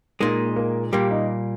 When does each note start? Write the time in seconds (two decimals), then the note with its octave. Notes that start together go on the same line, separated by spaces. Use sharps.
0.20 A#2 G#3 A#3 D#4
0.56 A#3
0.92 A#2 G3 A#3 G4
1.11 D#4